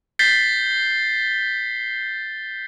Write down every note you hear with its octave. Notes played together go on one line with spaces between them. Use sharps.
G6 A6 B6 C7 G7